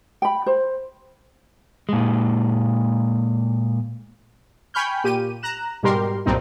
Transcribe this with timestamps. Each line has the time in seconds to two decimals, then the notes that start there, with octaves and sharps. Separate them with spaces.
0.22 G5 B5
0.46 C5
1.89 A#2 G#3
4.74 G5 G#5 B5 C#6 F6 G6
5.04 A#2 G4 D#7
5.43 A#5 F#6 E7
5.83 G#2 B2 G3 G4 A#4 C6
6.26 B1 G2 A#2 C4 D#4